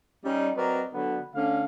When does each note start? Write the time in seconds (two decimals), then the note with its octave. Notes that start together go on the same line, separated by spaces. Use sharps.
0.25 G3 C#4 D#4
0.57 F#3 C4 A#4 B4 D5 D#5
0.93 D3 F#3 B3
1.35 D3 A3 C#4 D4 F5